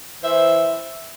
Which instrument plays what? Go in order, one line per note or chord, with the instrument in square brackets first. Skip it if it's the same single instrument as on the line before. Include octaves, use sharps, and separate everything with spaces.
[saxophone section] E3 C5 E5